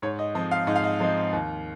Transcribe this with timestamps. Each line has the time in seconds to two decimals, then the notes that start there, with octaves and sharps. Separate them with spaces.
0.02 G#2 C#5
0.19 D#5
0.35 F3 C4 D#4 D#5
0.51 F5
0.67 G#2 D#5
0.76 F5
0.84 D#5
1.00 F3 C4 D#4
1.33 D#2